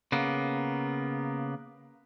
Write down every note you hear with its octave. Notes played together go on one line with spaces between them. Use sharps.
C#3 A#3 B3